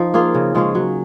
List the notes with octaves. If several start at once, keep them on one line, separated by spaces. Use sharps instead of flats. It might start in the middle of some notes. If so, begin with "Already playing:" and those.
Already playing: F3 D#4
A#3 F4 G#4
C#3
F3 G#3 C#4
F#3